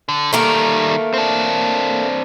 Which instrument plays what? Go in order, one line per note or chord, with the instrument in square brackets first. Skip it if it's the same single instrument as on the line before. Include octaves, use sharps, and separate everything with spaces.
[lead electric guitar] D3
[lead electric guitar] D#3 G3 [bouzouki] A3 A#3 A#4
[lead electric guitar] C4 D4